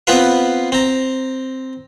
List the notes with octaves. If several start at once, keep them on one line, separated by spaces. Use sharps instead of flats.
B3 C4 F4 B4 F5
C4 A#5